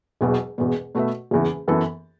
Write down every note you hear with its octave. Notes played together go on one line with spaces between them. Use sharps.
E1 E2 B2 F#3 B3
E1 E2 B2
B2 A3 F#4 B4 E5
F#1 E2 E3
F#2 E3 B3 A4